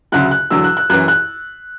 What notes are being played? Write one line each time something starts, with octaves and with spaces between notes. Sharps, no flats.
D2 C#3 F#3 F#6
F#6
E2 D3 F#3 E6
F#6
F#6
F#2 E3 F#6
F#6